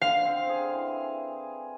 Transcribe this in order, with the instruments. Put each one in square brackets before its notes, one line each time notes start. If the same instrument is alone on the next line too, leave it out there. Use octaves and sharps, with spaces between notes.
[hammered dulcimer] D3 [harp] F5
[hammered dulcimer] C4
G#4
E3